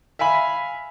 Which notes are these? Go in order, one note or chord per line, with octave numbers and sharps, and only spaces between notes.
E5 F5 G#5 B5